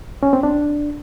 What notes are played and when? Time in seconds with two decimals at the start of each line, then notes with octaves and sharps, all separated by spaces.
0.23 C#4
0.33 C4
0.43 D4